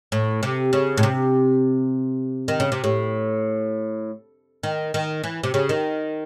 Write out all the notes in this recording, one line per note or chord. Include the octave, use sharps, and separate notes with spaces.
A2
C3
C#3
A2
C3
D#3
C#3
C3
A2
D#3
D#3
E3
C3
C#3
D#3